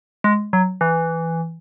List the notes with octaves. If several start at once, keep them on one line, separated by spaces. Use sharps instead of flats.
G#3
F#3
E3